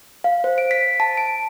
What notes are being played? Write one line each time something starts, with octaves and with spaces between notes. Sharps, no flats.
F5
C5
D7
B6
A5
D7